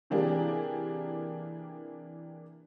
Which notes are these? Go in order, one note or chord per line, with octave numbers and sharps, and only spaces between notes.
C3 E3 A#3 D4 G4 G#4